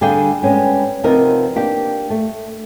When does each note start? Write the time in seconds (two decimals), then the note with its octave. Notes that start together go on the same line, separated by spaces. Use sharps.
0.01 D3 G3 D4 G#4 F5 G5
0.43 G3 G#3 B3 C#4 G4
1.04 C3 F3 B3 D#4 A#4
1.56 A#3 D4 G4
2.10 A3